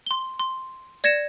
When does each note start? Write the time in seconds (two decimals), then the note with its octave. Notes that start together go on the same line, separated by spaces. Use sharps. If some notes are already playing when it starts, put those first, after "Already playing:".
0.06 C6 G7
0.40 C6
1.04 D5 G#6 A#6 C#7 E7